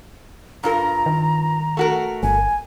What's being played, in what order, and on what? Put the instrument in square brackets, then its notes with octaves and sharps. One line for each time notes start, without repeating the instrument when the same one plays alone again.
[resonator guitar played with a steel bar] G2 F4 A#4 [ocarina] A#5
[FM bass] D#3
[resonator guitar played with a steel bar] A3 F#4 A#4
[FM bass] G1 [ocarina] G#5